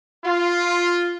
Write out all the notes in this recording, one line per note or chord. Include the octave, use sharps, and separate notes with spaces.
F4